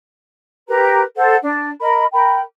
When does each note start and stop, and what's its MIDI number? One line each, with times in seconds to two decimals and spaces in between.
0.68 1.00 67
0.68 1.00 70
0.68 1.00 71
0.68 1.00 82
1.16 1.35 69
1.16 1.35 72
1.16 1.35 78
1.43 1.69 62
1.80 2.05 70
1.80 2.05 75
1.80 2.05 83
2.13 2.39 70
2.13 2.39 79
2.13 2.39 83